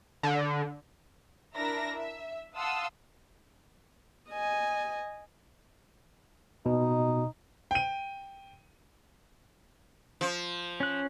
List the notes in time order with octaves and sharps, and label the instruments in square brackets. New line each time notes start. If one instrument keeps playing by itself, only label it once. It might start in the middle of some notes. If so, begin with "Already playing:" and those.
[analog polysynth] D3
[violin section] D4 E4 A#4 E5 A#6
E5
F5 F#5 A5 C6 D#6 E6
[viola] D#5 G#5
[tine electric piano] B2 [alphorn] D#4
[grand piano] G5 D#7
[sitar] F3
[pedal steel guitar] C#4 F#6